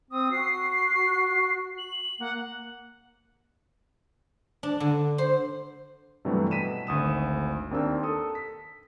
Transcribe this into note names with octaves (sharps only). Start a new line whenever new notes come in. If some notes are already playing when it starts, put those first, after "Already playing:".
C4 D#6
F#4 C7
F#7
A#3 F#5
D4
D3
C5
G2 C3 E3 F#3 G3 A3
B2 B6 D#7 E7
G#1 D2 D#6 E7
D#2 C4 D4 A#4 E6
A4 D#6
B6